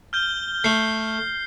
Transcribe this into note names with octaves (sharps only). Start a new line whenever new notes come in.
F6 G6 G7
A3 C7